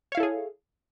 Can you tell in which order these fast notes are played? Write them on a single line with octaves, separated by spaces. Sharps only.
C#5 F5 E4 A4 G#4